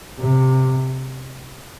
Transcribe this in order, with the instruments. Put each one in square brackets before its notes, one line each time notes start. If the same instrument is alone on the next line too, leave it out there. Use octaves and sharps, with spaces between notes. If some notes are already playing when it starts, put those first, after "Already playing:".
[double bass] C3